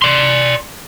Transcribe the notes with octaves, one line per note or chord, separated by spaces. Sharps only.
D5 C6